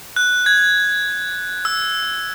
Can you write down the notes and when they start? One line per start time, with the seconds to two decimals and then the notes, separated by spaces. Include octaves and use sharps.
0.16 F#6
0.46 G#6
1.65 E6